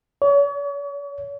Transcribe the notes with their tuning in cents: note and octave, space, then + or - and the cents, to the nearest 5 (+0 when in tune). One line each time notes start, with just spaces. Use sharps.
C#5 +40